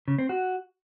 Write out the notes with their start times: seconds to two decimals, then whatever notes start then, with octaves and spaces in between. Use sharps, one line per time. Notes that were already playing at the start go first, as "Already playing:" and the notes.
0.08 C#3
0.18 C4
0.29 F#4